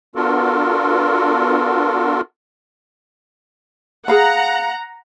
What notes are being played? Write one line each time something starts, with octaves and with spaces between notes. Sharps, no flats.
B3 D4 F4 F#4 A4 A#4
G#4 F5 F#5 A#5 B5